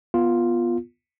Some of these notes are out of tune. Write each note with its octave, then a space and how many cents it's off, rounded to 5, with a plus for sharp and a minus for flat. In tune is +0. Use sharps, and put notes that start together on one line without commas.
B3 -15 F4 +0